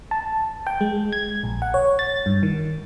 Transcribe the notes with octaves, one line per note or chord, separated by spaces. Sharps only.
A5
G5
G#3
G#6
A#1
F#5
C#5
A6
G2
D#3